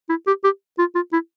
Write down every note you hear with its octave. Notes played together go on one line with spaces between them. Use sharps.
E4
G4
G4
F4
F4
E4